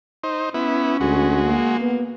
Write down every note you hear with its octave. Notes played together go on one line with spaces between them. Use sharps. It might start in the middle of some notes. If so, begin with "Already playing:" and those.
D#4 C5
B3 C#4 E4
D2 G#3 F#4
A#3
B3